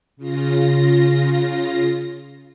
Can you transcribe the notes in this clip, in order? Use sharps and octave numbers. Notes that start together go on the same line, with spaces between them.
C#3 F4 A#6